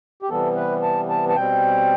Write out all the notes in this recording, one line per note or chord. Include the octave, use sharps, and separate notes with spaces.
G4
C3 E3 G3 B3 A4
B4
A5
A5
A5
B2 G3 C4 G5